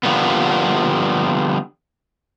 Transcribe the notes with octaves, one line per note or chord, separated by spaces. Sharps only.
D3 F3 G3 A#3 B3